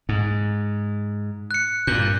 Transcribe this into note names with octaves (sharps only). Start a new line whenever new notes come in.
G#2
F#6 C#7
G2 A#2 G6